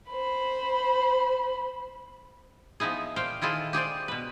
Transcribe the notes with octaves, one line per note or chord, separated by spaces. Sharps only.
C5 B5
F3 B3 D#4 E4 G#4
A#2 C5 F5 G5
D#3 E4 F4 G#4 A4
G4 G#4 C5 D5
B2 B4